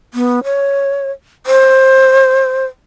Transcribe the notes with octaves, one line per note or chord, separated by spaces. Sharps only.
B3
C#5
C5